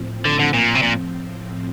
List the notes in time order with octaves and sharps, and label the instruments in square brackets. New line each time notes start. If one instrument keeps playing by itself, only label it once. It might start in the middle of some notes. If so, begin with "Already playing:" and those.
Already playing: [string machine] A2 F3 C4
[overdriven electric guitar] D3
D3
A#2
C3
A#2